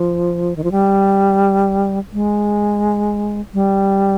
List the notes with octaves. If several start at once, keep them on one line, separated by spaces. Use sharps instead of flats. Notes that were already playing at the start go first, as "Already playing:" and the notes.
Already playing: F3
D#3
F3
G3
G#3
G3